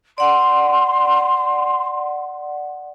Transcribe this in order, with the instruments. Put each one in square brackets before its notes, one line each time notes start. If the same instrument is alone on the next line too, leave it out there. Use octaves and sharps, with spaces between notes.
[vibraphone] D5 F#5 [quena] C6